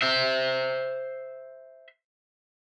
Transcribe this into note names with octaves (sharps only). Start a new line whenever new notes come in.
C5 E5